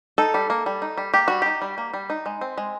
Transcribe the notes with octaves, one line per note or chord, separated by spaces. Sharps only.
D#4 A4
G3
A#3
G3
D#4
G3
A#3 G4
G3 F#4
D#4 G4
G3
A#3
G3
D#4
G#3
C4
G#3